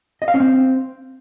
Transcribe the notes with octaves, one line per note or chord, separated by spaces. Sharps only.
D#5
F5
C#4
C4